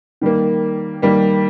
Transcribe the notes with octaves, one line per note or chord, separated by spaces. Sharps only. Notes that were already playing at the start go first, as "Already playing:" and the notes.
D#3 G3 A#3
D#3 G3 A#3